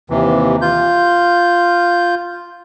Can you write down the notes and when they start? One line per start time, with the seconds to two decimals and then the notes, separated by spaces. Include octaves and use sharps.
0.10 D#2 C3 E3
0.62 F4 G6